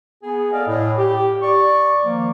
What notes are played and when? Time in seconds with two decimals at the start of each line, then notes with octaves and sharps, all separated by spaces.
0.23 B3 G#4
0.52 A4 D5 D#5 F5
0.68 A2
0.98 G4
1.42 D5 C#6
2.05 D#3 F3 A#3